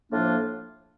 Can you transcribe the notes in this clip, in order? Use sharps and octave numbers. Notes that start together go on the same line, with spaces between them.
A2 F3 A#3 D4 F4